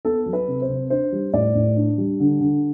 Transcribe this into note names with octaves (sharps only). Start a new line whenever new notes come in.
B3 A4
F#3
B4
C3
C5
C3
D4 C5
G3
A2 D5
A2
D4
G3
D3
D3